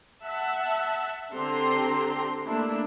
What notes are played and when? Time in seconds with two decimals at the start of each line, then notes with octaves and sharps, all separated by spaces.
0.24 E5 F#5 A5
1.33 D3 C4 D4 G4 A#5 C6
2.44 A3 A#3 D4 E4